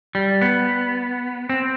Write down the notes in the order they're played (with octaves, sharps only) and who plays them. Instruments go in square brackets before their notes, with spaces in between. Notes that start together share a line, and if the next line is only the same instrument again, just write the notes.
[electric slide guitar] G3
B3
C4